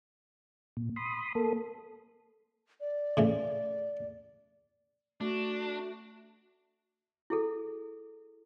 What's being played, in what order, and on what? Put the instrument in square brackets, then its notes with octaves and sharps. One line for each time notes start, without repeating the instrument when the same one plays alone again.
[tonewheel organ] A#2
B5 C6 D#6
A#3 A4
[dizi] D5
[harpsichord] A2 C#3 E3
[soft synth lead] A3 [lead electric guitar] D4 [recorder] F#4
[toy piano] E4 G#4 A4